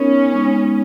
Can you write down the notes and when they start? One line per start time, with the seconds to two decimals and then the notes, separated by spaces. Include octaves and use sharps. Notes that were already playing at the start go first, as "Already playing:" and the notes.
Already playing: B3 C#4 D#4 A#4
0.32 G#3 B3 D#4